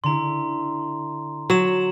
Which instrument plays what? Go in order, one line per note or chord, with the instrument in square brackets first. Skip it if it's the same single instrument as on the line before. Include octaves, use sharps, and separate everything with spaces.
[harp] D3 E4 [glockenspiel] A#5 C6
[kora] F#3 [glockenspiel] E7 F#7